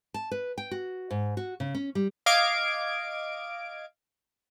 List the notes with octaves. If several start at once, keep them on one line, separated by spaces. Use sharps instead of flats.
A5
B4
G5
F#4
G#2
F#4
C#3
C#4
G3
D#5 F5 D6 G#6 D7